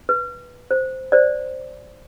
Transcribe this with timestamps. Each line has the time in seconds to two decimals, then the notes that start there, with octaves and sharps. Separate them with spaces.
0.09 B4
0.71 C5
1.12 C5 D5